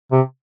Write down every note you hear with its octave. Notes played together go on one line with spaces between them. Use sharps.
C3